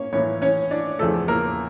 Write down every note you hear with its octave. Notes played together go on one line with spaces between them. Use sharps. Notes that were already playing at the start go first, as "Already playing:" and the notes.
Already playing: A#3 C#4 C#5
A2 E3 A#3 C#4 C#5
C#4 C#5
D4 D5
E2 C#3 F3 A3 A4
A#3 A#4